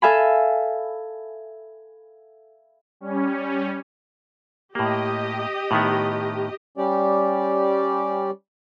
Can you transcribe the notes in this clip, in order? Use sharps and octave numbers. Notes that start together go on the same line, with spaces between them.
A4 E5 F5 G#5 B5
G3 C#4
A2 A#3 G4 D#5
A2 D#3 B3
G3 C#4 G4 D5